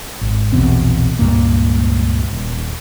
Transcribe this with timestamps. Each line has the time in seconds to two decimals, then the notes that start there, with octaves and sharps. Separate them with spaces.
0.21 G#1
0.53 A#1 E2 B2 C4
1.19 C#2 G2 A#2 A#3
2.33 D#1